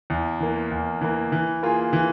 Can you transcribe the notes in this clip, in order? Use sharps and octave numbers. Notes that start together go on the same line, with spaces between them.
E2
E3 A#3
E2
E3 A#3
E3
A#3 F4 G#4
E3